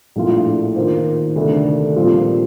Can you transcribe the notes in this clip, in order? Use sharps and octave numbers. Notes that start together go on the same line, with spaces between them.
A#1 A2 A3 D4 F4
D#3 A#3 F4 C5
D2 C3 D#3 A3 D4
A#1 A#2 G3 C4 F4